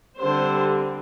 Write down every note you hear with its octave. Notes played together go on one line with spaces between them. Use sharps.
D3 G3 C4 C5